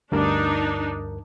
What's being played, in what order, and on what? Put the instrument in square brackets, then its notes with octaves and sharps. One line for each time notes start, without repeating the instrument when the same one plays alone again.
[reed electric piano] D2 G2 A#4 [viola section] D4 D#4